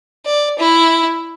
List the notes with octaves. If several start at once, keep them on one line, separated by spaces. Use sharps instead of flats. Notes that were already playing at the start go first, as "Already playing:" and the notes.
D5
E4